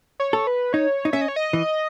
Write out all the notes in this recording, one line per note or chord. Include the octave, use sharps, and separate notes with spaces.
C#5
A4
B4
D#4 C#5
D#4
C#4 E5
D#5
C#5
D#5
E3